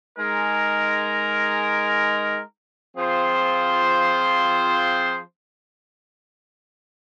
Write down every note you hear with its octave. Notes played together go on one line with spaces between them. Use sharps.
G#3 D#4 A#4
F3 C4 F4 G#4 C5